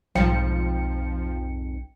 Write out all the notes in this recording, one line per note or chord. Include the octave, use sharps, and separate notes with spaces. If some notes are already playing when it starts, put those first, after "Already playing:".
B1 F2 G#2 F3 G5 C#7